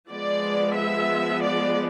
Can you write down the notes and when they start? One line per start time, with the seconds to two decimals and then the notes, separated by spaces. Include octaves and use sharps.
0.11 F3 G#3 B3 D5
0.76 E5
1.43 D5